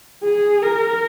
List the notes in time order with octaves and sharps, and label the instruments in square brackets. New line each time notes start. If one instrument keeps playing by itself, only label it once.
[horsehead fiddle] G#4
A#4